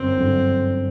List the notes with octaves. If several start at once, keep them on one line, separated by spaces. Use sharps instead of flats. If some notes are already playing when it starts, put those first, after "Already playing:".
Already playing: G1 F#2 D3 C4
G1 F#2 D3